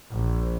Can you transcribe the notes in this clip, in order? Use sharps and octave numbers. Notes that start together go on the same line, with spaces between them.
A#1